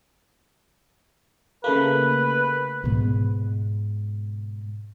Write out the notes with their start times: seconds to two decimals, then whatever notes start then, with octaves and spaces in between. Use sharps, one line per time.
1.64 C#3 A3 A#3 B4
2.84 G#2 B2